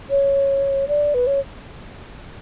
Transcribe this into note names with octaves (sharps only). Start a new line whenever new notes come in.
C#5
D5
B4
C#5